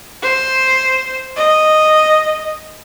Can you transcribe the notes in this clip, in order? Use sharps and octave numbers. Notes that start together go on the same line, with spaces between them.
C5
D#5